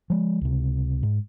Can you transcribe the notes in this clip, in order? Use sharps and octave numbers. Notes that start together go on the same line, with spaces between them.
F3 G#3
C#2 C3
G#2